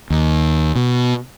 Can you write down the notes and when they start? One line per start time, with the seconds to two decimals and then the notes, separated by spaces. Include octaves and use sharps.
0.10 D#2
0.76 B2